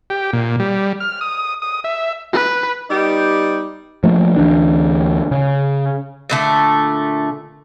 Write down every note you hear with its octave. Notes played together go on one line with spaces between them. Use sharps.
G4
A#2
G3
F6
D#6
D#6
E5
B4
G3 B3 D#4 G4
F3 A3 A#3
D2 E3 D4
C#3
A#2 D3 A3